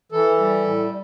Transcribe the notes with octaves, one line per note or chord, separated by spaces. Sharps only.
E3 A4
G3
A2